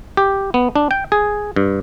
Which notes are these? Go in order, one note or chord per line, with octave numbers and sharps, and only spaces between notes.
G4
B3
D4
G5
G#4
G2